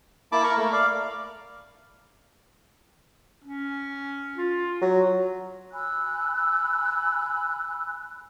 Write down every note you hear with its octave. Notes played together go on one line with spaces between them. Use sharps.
A#3 E4 A5 B5 D6
A#4 B5 C#6
A3 A#3
D5 F5
C#4
F4
F#3
G#5 B5 E6 F#6